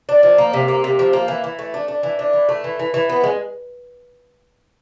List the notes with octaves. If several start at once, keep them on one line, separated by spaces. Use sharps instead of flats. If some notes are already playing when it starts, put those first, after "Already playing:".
D4
F3
A#3
C3
A#3
C3
F3
A#3
E3
E3
A3
D4
D4
E3
D4
E3
A3
E3
E3
E3
B3
G#3